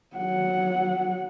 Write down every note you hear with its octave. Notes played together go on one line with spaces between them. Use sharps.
F#3 F#5